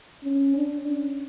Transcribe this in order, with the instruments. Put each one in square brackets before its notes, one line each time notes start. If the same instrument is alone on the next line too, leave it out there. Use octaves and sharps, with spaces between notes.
[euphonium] C#4
D4
C#4